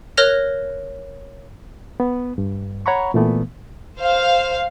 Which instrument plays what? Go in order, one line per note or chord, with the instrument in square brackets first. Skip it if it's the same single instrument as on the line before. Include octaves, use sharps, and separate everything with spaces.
[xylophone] A#4 C#5 F6 F#6 A#6 F7
[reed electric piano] B3
G2
C#5 F#5 A#5 B5 C#6
A#2 E3 A3 B3
[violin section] C5 F5